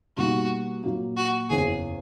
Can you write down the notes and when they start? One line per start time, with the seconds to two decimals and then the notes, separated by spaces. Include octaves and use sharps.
0.17 B2 G3 A#3 D#4 F#4
0.84 A#2 F#3 A#3
1.17 F#4
1.50 F#1 E2 C#3 G#4